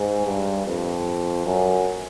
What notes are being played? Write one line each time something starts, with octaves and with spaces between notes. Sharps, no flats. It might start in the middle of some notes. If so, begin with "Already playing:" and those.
Already playing: G#2
G2
F2
F#2